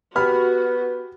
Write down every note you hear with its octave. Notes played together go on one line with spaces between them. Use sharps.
B3 F#4 G4 B5 F6